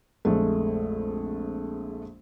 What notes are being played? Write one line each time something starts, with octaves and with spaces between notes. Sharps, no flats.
A#1 F2 G#3 A3